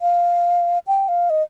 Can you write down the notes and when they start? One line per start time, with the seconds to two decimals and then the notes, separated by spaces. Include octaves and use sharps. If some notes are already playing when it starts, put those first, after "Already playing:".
0.02 F5
0.87 G5
1.08 F5
1.30 D#5